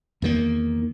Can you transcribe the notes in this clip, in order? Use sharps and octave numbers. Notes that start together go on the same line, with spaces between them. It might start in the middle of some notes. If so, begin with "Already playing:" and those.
E2 D#3 A#3